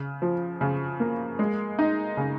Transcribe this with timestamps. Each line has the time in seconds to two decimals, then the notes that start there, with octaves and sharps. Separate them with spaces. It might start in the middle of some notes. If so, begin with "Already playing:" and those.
Already playing: C#3
0.22 F3
0.61 C#3
1.00 A#3
1.39 G#3
1.79 D#4
2.17 C#3